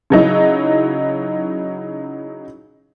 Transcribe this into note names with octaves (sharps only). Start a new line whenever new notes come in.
C#3 F#3 D#4 E4